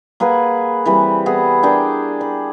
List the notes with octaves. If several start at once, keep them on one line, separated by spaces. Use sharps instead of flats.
A#3 G#4 B4 F#5
E3 G3 C4 B4
B3 E4 G#4 A4
D4 G#4 A#4 G5
B5